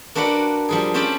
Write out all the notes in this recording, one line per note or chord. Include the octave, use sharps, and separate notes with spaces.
A#3 D4 F#4 B4 F#5
F3 G3 G#4
C4 C#4 G4 G5 A5 B5